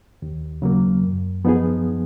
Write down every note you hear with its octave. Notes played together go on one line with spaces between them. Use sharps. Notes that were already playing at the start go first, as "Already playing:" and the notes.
D#2
C#3 F#3 A#3
F#2
F3 B3 D#4 G#4